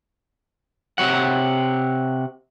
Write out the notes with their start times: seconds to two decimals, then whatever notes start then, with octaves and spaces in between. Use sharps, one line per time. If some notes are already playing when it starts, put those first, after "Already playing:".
0.98 C3 C#5 F#5